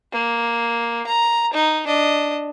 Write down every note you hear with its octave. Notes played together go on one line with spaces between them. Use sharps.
A#3
A#5
D#4
D4 D#5